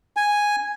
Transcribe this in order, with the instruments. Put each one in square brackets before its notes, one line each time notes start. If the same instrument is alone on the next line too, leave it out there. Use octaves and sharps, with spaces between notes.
[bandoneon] G#5